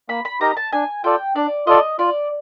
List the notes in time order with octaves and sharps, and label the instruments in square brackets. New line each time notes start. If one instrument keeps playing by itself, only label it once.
[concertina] A#3 [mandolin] B5
[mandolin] B5
[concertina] D#4 G4 A#4 D#5 [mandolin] A#5
[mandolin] A5
[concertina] D4 [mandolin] G#5
[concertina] F4 A4 D5 [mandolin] G5
[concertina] D4 [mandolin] D5
[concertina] F4 A4 D5 [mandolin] D#5
[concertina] F4 [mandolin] D5